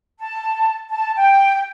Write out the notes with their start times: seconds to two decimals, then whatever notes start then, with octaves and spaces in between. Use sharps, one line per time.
0.20 A5
0.90 A5
1.16 G5